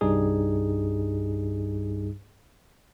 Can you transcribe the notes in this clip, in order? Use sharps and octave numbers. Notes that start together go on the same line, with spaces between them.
C2 G2 G3 D#4 G#4